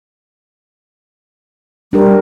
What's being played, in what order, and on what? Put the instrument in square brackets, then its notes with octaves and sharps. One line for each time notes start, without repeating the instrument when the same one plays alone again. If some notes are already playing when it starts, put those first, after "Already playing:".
[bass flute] G3 [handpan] D4 G4 A#4